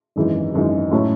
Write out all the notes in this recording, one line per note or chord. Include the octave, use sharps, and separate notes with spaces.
G#1 F#2 E3 G#3 D#4
G#1 F#2 E3 G#3 D#4
A2 F#3 A3 C#4 E4